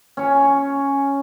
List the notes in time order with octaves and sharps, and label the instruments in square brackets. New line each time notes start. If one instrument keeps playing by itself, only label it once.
[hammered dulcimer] C#4 C#5